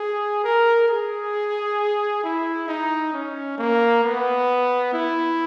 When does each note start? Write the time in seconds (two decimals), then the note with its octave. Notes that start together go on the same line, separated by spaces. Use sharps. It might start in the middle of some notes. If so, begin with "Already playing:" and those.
Already playing: G#4
0.44 A#4
0.89 G#4
2.24 E4
2.68 D#4
3.13 C#4
3.58 A#3
4.04 B3
4.93 E4